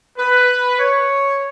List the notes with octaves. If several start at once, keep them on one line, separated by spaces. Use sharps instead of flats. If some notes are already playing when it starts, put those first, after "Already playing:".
B4
C#5